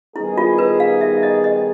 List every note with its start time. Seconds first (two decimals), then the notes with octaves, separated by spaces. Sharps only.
0.15 D#3 G3 B3 D#4 E4 G#4
0.38 F4
0.58 B4
0.80 F5
1.01 E5
1.23 D#5
1.44 D#5